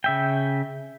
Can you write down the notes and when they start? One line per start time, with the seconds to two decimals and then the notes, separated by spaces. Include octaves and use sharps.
0.04 C#3 E5 G5